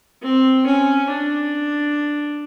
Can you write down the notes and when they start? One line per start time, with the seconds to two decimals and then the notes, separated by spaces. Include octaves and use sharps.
0.22 C4
0.66 C#4
1.10 D4